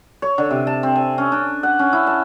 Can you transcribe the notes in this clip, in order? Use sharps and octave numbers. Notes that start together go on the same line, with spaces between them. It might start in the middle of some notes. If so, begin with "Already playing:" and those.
C#5
D3
C3
A5
C4
G#5
C#4
D4
F#5
C#4
E4
A5